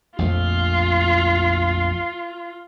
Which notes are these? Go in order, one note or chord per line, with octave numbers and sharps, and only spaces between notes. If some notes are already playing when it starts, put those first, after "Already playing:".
A#1 F2 A3 F4